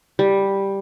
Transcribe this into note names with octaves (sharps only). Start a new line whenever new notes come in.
G3